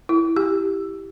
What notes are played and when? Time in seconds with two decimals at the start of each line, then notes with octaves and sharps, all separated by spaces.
0.09 E4
0.37 G4